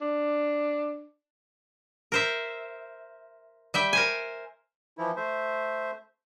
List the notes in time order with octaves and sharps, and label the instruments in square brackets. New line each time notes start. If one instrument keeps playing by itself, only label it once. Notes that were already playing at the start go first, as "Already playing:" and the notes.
[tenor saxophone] D4
[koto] A#4 C5 E5
G3 E5 G5
A#4 C5 G#5
[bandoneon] E3 F3 E4
A3 C5 E5